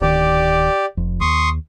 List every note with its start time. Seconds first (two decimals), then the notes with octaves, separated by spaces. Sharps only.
0.01 D1 D#3 G4 D5
0.97 F1 F2
1.21 D#2 C6 C#6 D#6